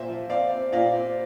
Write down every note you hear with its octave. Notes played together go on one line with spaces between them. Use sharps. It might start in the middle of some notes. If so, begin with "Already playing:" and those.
Already playing: A#2 C5 E5
F3
C4 D5 F5
C4
A#2 D5 F5
C4